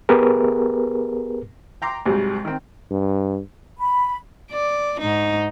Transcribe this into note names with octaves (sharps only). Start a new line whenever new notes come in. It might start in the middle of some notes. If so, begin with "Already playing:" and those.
B3 G4 G#4 A#4 B4
G5 A#5 C6 D6
C2 G#2 C3 F#3 G3
D#3 C4
G2
B5
D5
G#2 D#4